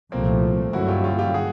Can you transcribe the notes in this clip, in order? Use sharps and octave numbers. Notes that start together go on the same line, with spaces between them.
C2 A#2 F3 A3 A#3 C4
G2 D3 F#3 A#3 C#4 E4 F#4
F4 G4
F4 G4
F4 G4
F#4 G#4